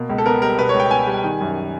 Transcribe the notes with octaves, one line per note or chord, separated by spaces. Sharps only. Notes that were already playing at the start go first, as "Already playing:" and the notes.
Already playing: B2 A#3
C#2
A4
B3 A#4
G3 A#4
B2 B4
C#5
C#2
G5
B3 G#5
G3
D#3
F#2